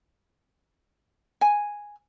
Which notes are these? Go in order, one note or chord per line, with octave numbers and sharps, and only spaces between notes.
G#5